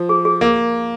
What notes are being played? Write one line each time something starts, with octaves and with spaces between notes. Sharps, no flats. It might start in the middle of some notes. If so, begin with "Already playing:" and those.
Already playing: F3
G#4
G#4
A#3 A#4